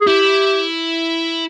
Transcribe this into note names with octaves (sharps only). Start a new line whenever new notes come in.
G#4
E4 G4